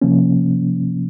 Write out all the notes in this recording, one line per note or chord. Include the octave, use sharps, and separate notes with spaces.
C3 F3 A#3 C#4